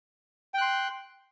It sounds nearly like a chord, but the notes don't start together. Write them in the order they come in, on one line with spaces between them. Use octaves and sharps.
G5 F#6 C6